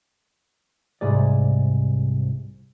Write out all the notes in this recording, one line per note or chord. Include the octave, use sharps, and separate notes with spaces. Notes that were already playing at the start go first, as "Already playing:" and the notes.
C2 G#2 G#4 D5